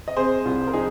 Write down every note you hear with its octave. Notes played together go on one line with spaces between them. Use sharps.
D#5
C3 G#4 C5
C2 F4
A#4
F3 D#4 G#4